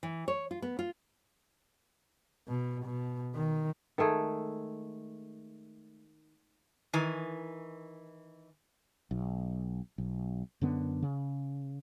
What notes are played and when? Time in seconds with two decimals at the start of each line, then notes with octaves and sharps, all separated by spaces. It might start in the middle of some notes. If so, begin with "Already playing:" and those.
0.03 E3
0.28 C#5
0.51 F4
0.62 B3
0.79 F4
2.48 B2
2.85 B2
3.35 D#3
3.98 D#3 G#3 A3 G#4
6.93 D#3 E3 G#5
9.11 B1
9.98 B1
10.61 F#2 D3 B3
11.02 C#3